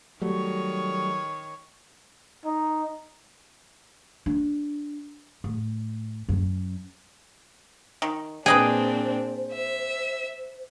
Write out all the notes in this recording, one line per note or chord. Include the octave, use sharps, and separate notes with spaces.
D#3 F#3 G3 A3 C#5
D#4
D4
A2
F#2
D#3
A#2 C4 D4 G#4 B4 C5 D#5 G5
E5